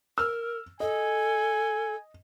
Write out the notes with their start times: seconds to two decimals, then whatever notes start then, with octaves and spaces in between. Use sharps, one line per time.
0.18 A#4 E6 F6
0.80 A4 D#5 G#5